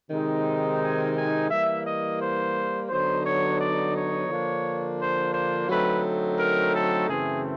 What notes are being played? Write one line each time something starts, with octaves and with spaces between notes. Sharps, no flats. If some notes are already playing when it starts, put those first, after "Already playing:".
C3 D#3 G#3 C4 D#4
G#5
G#5
E3 G3 A#3 E5
D#5
C5
D3 F#3 B3 D#4 C5
C#5
D5
C#5
D3 F3 A#3 D4
C5
C5
D3 F#3 A3 C4 D#4 B4
A#4
A4
F#2 C#3 E3 A3 C4 G#4